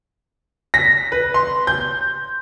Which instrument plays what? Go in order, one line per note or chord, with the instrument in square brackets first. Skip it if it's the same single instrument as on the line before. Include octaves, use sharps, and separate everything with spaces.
[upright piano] A#6 [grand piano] B6
[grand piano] B4
C6
[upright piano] G6